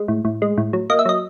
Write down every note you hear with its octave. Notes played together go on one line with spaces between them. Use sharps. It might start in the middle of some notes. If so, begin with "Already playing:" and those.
Already playing: G#3
A2
A2
G#3
A2
F#3
A#3 D#5
E5
F#3 D#5